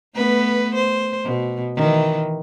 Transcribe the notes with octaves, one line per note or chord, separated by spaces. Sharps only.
A3 B3 B4
C5
B2
D#3 E3